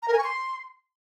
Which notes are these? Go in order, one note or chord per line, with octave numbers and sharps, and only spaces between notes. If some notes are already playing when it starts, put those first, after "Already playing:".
A#5
A#4
G#5
C#6
C6